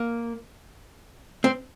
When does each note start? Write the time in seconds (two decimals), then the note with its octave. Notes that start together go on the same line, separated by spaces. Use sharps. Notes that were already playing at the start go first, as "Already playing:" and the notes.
Already playing: A#3
1.44 C4